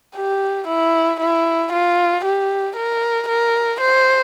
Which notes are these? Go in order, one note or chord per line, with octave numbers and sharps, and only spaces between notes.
G4
E4
E4
F4
G4
A#4
A#4
C5